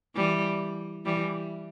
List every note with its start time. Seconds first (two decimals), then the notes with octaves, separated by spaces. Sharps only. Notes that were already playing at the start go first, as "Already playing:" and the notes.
0.15 E3 G3
1.05 E3 G3